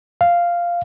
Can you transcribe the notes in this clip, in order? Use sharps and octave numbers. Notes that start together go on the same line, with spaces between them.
F5